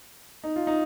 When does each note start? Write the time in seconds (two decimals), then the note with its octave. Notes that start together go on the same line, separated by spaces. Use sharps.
0.44 D#4
0.56 F4
0.67 D#4